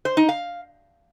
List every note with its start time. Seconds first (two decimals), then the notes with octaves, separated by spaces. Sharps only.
0.05 C5
0.17 D#4
0.29 F5